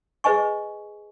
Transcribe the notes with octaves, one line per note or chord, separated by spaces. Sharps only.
G#4 B4 D#5 G#5 C#6